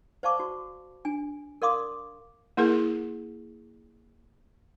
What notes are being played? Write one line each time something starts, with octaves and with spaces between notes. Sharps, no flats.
C5 D5 F5 A5 C#6 D6
F#4
D4 G#5
A#4 D5 F5 C6 D6 D#6
A#3 E4 G#4 A#4